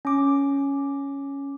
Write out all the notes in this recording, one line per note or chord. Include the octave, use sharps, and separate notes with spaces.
C#4 D6